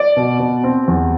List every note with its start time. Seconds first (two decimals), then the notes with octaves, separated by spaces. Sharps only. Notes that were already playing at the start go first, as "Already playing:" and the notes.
Already playing: D5
0.17 B2
0.40 B2
0.64 C4
0.88 E2